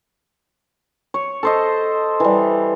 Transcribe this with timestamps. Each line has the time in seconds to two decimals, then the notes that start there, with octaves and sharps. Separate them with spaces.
1.14 C#5
1.43 A4 C5 D#5
2.20 E3 G3